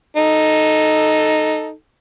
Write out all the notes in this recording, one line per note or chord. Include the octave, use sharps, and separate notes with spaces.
D#4 A4